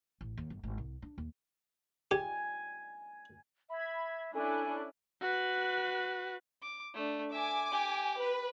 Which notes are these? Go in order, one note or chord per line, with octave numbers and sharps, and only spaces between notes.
A1
D#2
G1
G#1
C2
D4
D#2
G4 G#5
E5 B5 G#6
C#4 D4 E4 A4 G#5 D6 F#6
F#4 B4
D6
A3 D4
E5 G#5 D6
G4
B4